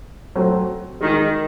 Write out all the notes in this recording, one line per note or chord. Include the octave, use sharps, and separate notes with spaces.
F#3 A3 C4 F#4
D#3 G#3 D#4 G#4